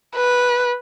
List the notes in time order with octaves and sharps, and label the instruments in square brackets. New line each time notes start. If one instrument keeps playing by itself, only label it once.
[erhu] B4